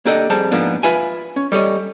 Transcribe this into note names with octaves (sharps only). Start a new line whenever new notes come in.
A#3 D4 G4 A4 D5 D#5
F2 G3 G#4 C5 A5 A#5
G#2 F3 A#3 B3 D4 F4
F4 B4 E5 G#5
C#4
G3 A4 C#5 D#5